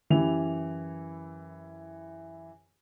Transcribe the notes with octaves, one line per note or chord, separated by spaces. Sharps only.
F#2 E3 E4 G4 F7